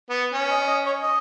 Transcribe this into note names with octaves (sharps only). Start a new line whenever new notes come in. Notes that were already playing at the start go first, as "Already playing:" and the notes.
B3
C#4
D#5
D#5
C#5
D#5